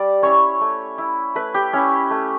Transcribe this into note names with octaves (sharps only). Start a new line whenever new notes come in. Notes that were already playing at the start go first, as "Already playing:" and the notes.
Already playing: G3 D5 D6
C#4 E4 C#5 C#6
A3
E4
A3 B4 B5
G4 G5
C#4 E4 C#5
A3